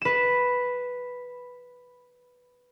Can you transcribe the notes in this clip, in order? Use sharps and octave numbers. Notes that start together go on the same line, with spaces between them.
B4 E7